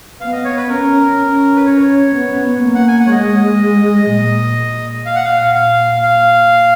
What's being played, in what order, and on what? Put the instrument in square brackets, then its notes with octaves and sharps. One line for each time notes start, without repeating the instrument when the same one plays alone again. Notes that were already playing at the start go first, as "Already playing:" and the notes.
[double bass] B3 [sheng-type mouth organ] F5
[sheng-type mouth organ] D#5
C#5
B4
[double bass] C#4 [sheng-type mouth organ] A#4
[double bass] C#4
[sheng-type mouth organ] B4
C#5
[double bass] B3
A#3
[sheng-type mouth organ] F#5
G#5
F#5
C#5
[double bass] G#3 [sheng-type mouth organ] D#5
[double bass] A#2
[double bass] A#2 [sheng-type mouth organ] F5
[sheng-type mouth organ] F#5
F5
F5
F5